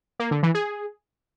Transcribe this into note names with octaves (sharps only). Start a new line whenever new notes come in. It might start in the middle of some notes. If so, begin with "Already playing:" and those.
A#3
D3
E3
G#4